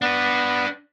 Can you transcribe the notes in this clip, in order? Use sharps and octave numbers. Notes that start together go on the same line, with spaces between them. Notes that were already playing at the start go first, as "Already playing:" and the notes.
B3 D4 B4